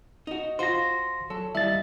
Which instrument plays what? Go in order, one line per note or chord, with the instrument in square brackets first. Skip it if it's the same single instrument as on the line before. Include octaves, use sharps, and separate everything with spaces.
[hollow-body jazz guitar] D#4 F#4
[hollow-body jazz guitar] F4 F#4 C5 [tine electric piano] C6 A#6
[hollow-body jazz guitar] F#3 A4
[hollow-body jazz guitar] D#2 G3 E4 [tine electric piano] E5 A6